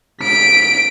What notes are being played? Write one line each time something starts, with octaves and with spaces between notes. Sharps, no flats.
B6 D7